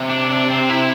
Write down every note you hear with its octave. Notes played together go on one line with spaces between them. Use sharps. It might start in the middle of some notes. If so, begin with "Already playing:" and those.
Already playing: C3
D4
D4
C4
E4